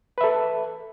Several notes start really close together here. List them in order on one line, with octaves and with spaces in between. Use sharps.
B4 E5 A4